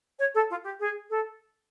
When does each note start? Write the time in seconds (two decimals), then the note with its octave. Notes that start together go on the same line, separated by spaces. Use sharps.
0.19 C#5
0.34 A4
0.50 F4
0.64 G4
0.80 G#4
1.10 A4